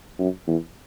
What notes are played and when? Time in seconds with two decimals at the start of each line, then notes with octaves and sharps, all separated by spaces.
0.19 F#2
0.47 E2